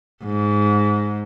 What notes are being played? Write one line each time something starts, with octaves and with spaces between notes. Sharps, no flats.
G#2